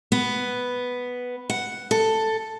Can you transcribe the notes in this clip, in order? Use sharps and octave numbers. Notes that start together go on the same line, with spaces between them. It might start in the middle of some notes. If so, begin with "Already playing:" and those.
B3
F#5
A4